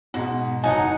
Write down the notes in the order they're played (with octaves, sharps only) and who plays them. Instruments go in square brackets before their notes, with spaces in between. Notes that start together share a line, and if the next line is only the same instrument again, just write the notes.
[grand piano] G#2 B2 [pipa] F#4
[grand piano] F#1 F#3 A5 [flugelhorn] D#4 [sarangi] F#5 [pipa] G#5